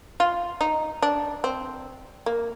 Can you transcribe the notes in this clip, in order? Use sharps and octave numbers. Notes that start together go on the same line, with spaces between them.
F4
D#4
D4
C4
A#3